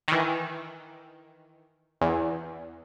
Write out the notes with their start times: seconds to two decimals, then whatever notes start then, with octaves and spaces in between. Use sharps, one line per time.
0.08 D#3 E3
2.01 E2